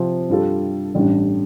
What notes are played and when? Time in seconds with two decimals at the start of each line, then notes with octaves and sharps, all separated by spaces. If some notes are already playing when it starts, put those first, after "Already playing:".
Already playing: C3 F3 C4 F4
0.29 G2 G3 F4 A4
0.95 A1 G2 G3 D4